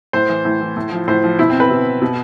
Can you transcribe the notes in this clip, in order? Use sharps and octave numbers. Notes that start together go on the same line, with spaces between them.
A2 C5
E3
A2
E3
A2
F3
A2 C5
F3
B2 E4
C4
B4
B2
B2